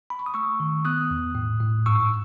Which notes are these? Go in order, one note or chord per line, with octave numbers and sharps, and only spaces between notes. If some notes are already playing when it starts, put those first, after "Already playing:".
B5
C#6
D#6
A3 C#6 E6
D#3
B3 D#6 F#6
E2
A2
A2
G#2 C#6 E6